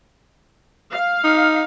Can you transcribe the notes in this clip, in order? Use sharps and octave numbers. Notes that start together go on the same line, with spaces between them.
F5
D#4